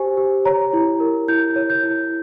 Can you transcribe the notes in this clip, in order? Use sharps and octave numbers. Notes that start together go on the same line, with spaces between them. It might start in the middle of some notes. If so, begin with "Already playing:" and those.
Already playing: G4 C5 G#5
G4
C#5 A#5
E4
A#4
E4 G6
C#5
G6
E4